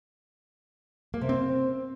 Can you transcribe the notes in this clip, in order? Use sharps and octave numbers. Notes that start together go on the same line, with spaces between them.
A#3
C3
C4